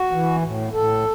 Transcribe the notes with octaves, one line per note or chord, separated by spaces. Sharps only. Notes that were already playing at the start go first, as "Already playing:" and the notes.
Already playing: F#4
E3
A2
A2 A4